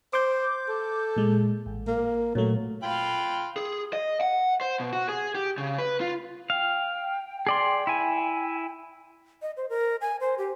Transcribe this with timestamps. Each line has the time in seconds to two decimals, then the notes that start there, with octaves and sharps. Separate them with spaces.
0.13 C5 D6 G6
0.68 A4
1.16 A#2 G#3
1.66 A1
1.87 A#3
2.35 A#2 F#3 A3
2.83 F4 F5 G5 B5
3.56 G#4
3.93 D#5
4.21 F#5
4.61 C5
4.80 B2
4.93 F#4
5.09 G#4
5.35 G4
5.58 C#3
5.78 B4
6.00 F4
6.50 F5 G5
7.47 G#4 D5 C6
7.87 E4 G#5
9.42 D#5
9.57 C5
9.69 A#4
10.01 G#5
10.20 C5
10.38 G4